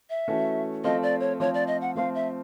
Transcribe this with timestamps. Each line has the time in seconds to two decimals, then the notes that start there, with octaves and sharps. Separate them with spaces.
0.10 E5
0.28 E3 A3 C#4 F#4 A4
0.84 F3 A3 C4 F4 A4 D#5
1.03 D5
1.20 C#5
1.40 F3 A3 C4 F4 A4 C#5
1.54 D5
1.67 D#5
1.81 F#5
1.95 F3 A3 C4 F4 A4 F5
2.15 E5